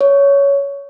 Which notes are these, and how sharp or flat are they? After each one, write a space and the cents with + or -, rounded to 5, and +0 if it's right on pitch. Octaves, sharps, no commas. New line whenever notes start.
C#5 +15